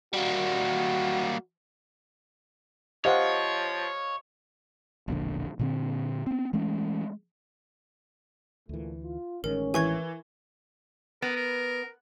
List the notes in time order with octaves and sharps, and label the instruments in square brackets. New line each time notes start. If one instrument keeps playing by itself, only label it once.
[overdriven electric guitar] G3 A#3 [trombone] F#4
[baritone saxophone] F3 [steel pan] G4 C5 F#5 [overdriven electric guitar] C#5 [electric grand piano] D#5 F5
[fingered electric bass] E1 A#1 D3
A#2 D3 C4
B3 C4
E3 G#3 A3 C#4
[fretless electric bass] D2 E3 [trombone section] A#2 A3
[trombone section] F4
[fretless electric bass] A1 D#3 G#3 [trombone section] C#4 [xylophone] A#4
[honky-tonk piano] E3 [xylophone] G#5 C#6 G#6
[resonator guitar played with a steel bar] B3 [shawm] A#4
[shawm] A#4